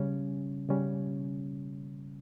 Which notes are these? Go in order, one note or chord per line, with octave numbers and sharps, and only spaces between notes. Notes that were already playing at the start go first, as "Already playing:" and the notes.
Already playing: C#3 G3 C#4
C#3 G3 C#4